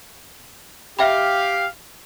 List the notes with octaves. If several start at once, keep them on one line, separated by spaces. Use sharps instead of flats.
G4 E5 F5 G5 B5